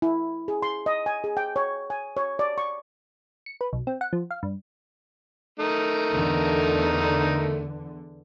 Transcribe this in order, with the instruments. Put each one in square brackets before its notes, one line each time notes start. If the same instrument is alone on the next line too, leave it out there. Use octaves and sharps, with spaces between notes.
[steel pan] E4
G#4
C6
D#5
G#5
G#4
G5
C#5
G#5
C#5
D5
C#6
[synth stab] C#7
B4
B1
C4
F#5
F3
F5
G2
[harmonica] A3 D#4 A#4
[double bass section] E2 D3